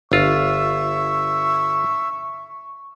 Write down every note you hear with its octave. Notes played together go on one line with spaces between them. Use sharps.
G1 F4 E5 C#6